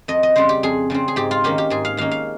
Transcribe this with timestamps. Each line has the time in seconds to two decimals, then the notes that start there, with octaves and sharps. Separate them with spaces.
0.08 F2 D#5
0.23 D#5
0.36 C#3 G3 C4 C5
0.49 G4
0.63 F2 G#4
0.90 C#3 G3 C4
1.08 G#4
1.16 G#2 G4
1.31 F4
1.44 D#3 A#3 C#4 G4
1.58 G4
1.70 G#2 G#4
1.85 F5
1.97 D#3 A#3 C#4 F5
2.11 F5